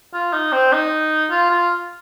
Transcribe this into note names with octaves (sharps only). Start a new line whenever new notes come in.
F4
D#4
C4
D#4
F4
F4